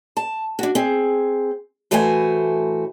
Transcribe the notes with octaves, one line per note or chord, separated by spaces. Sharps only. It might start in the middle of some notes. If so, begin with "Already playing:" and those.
A5
D4 F#4
C4 G#4
A2 E3 A3 F#4 C5 G#5